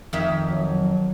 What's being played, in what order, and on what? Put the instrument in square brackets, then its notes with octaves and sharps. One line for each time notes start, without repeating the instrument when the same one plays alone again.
[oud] F2 D#3 E5
[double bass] F#3